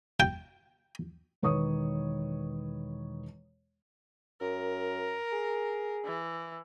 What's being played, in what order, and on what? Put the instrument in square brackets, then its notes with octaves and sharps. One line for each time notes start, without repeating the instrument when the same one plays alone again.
[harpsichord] G5
[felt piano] E1 D#3 B4 C#5 C#6 D#6
[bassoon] F#2 [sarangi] A#4
[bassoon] G#4
[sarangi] E3